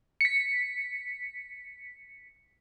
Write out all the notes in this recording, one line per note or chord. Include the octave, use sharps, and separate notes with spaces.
B6 C#7